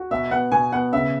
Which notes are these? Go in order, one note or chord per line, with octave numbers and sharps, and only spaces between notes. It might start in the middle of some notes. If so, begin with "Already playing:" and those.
Already playing: F#4
B2 E5
B3 F#5
B2 G#5
B3 F#5
C#3 E5